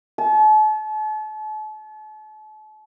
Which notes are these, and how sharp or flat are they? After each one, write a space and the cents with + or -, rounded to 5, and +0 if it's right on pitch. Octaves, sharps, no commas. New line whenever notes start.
A5 -40